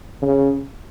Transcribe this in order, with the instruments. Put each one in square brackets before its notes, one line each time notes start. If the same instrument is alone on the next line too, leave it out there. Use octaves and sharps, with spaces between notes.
[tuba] C#3